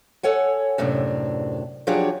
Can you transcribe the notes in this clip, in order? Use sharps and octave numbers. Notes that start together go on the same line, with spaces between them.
A4 C#5 F#5 G#5
F#2 A2 C3 D4
F3 F#3 D4 G4 G#4 C#5